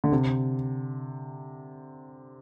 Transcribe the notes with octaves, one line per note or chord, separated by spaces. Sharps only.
D3
C3